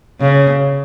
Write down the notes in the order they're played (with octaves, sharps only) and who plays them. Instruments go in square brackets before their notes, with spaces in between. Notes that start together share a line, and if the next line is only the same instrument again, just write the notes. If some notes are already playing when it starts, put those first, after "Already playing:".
[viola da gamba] C#3